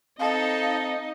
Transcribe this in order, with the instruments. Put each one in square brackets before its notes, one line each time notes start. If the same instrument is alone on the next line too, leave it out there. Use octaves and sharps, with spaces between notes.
[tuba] C4 [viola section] D#4 D#5 [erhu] A4 [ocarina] F5